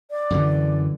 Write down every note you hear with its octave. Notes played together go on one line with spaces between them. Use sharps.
D5
F#2 D3 E3